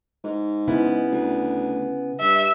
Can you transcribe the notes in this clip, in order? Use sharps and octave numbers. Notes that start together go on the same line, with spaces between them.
G#2
C#3 B3 E4
D2
G2 E5